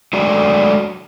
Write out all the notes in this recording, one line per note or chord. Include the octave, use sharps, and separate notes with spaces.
F#3 G#3 A3 D4 F#4 D5